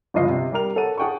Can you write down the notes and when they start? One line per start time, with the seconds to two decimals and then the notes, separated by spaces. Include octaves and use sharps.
0.14 G1 C#2 F3 F4 D#5 C7
0.29 C3
0.52 G3 G4 A#4 F7
0.76 A4 C#5 F#5 A5 D#7
0.98 G#4 F#5 G5 A5 C#6